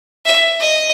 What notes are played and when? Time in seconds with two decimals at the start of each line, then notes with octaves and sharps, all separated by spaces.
0.26 E5
0.60 D#5